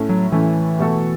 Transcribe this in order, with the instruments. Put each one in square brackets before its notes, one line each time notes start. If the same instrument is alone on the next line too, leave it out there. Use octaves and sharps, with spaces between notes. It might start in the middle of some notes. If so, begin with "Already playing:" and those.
Already playing: [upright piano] A2 A3 C#4 A4
[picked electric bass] F#3
[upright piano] A2 A3 C#4 A4 [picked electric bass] E3
[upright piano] B2 A3 F#4 A4